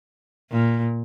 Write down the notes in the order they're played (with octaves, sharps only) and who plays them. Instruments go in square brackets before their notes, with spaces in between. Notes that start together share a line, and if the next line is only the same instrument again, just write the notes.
[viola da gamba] A#2